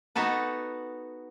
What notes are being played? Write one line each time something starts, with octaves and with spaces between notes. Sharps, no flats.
B3 D#4 F#4 A4 B4